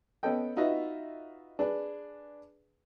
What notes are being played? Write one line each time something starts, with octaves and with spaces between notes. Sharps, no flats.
B3 C#4 A4 D#5 G5
D#4 F4 F#4 B4 D#5 E5
D4 G#4 B4